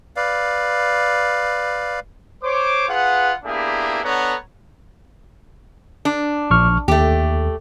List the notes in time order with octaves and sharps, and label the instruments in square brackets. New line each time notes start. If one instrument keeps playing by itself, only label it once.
[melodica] B4 D5 F5
[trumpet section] C5 C#5 D6
F4 G#4 B4 F#5
A#3 B3 D4 E4 G4 G#4
B3 D4 A4 C#5 F#5 A#5
[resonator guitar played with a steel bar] D4
[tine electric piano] A#1 C#6 F6
[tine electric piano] D#2 [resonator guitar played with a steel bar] A3 G4